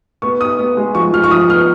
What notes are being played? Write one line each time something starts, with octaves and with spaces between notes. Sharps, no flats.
B3 C#6
B3 D#6
B3
G#3
F3 C#6
F3 F6
C#6
F3 D#6
B3 F6